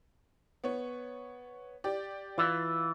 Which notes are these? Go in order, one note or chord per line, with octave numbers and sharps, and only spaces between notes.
B3 C#5
G4 D5
E3 F4 A6